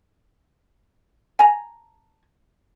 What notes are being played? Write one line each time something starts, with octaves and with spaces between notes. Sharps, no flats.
G#5 A#5